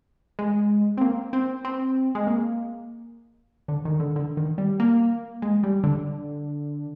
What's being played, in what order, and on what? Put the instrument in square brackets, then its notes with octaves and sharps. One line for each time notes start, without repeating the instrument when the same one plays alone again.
[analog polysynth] G#3
C4
A#3
C4
C4
G#3
A#3
D3
D#3
D3
D3
D#3
G3
A#3
G#3
G3
D3